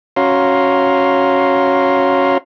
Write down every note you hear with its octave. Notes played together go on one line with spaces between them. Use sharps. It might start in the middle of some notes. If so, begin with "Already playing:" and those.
C#4 F#4 C#5 F5 A#5 C6